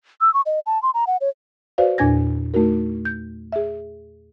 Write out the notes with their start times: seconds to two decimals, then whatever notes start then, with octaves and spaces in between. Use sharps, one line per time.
0.21 E6
0.34 C#6
0.46 D#5
0.66 A5
0.83 C6
0.94 A#5
1.07 F#5
1.21 C#5
1.78 F#4 B4 C5 D5 F5
1.98 E2 A#2 D4 G#5 G#6 A#6
2.54 A3 D#4 F#4 A#4
3.05 G6
3.52 G#4 E5